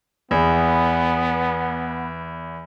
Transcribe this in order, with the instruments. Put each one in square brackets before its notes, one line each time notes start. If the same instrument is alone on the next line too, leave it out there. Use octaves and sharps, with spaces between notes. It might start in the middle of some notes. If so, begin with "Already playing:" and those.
[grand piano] E2 [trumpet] B3